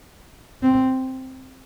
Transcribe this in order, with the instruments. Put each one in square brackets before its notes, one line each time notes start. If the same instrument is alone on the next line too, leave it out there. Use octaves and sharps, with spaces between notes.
[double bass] C4